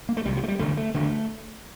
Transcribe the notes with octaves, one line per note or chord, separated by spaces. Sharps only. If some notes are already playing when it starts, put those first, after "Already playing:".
A#3
A3
C2 C3 G3
F3
A3
G3
E1 D2 D3 A3
A3
E1 D2 D3 A3